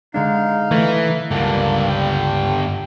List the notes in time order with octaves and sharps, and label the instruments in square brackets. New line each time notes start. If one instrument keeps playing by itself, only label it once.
[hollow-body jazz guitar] D3 G#3 D4 [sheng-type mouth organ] D#4 F5
[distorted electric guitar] E3 [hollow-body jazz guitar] A3
[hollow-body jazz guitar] C#2 [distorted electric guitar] G2 D3 [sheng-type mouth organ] A#3
[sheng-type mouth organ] G5